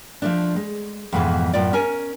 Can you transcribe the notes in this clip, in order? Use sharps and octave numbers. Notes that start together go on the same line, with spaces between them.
F3 A3 D4
G#3
F2 G#2 B2 D3 E3 F3
F#2 A2 F4 D5
C#4 A#4 G#5